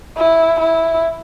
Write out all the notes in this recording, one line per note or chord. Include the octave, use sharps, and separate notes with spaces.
E4
E4